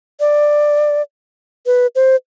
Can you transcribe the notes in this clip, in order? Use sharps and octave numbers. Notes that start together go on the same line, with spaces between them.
D5
B4
C5